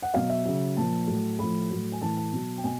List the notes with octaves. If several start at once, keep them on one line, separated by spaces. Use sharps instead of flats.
F#5
B2 F#3 F5
E5
C#3 F#3
A#2 F3 A5
A2 F#3
A2 F3 B5
A2 F#3
G#5
A2 E3 A5
A5
B2 F#3
G5
B2 G#5